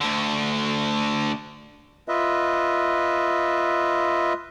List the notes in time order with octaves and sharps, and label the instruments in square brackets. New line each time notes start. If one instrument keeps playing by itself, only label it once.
[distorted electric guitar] D2 D3
[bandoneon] F4 B4 D#5 E5